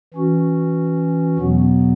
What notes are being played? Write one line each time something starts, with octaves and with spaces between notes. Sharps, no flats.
E3 C#4 F#4
E2 B2 F#3 B3